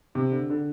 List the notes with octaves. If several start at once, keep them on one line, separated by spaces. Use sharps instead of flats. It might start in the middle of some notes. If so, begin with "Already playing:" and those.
C3
D3
D3